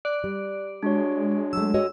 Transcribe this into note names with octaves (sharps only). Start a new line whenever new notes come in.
D5 F#6
G3
G#3 D4 F#4 C#5
F#3 A3 E6
F#4 C#5 D#5